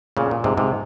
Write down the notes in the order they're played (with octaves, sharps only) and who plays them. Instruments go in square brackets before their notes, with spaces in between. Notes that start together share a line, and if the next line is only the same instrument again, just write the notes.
[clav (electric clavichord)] A#2 C#3
A#2
G#2 C3
G#2 C3